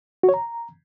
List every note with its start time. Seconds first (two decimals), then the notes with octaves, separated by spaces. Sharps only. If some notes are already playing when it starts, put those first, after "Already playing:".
0.23 F#4
0.29 C#5
0.34 A#5